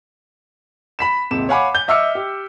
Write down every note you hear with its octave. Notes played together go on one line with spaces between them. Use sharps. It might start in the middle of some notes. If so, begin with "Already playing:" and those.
B5 B6 E7
D#1 G#2 C3 E7
C#5 F5 F#5 G#5 B5 D6
G6 G7
D#5 E5 D6 E6 F6 C#7
G4